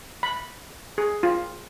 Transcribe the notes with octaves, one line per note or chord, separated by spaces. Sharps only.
B5
G#4
F4